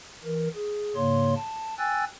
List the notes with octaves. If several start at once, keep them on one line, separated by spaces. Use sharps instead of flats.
E3 A#4
G#4
G#2 C#3 A#3 C#5 C6
A5
G5 G#5 E6 F#6 A6